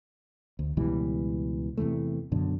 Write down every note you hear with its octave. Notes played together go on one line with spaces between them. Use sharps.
D2
C#2 B2 E3 G3
E2 C3 E3 A3
F#2 B2 D3